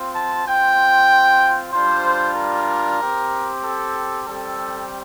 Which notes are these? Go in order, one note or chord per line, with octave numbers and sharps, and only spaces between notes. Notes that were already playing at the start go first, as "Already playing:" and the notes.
Already playing: C4 F4
A5
C4 F4 G5
G3 D4 F4 C5
A#4
C4 G4
A4
G3 C4 G4 A4